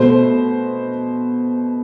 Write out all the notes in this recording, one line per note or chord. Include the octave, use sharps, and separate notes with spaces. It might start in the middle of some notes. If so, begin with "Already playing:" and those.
Already playing: B2 A3 C5